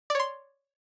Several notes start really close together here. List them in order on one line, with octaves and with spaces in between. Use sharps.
D5 C#5 C6